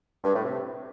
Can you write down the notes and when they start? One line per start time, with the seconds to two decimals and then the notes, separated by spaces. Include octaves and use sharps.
0.24 G2
0.34 A2
0.44 C3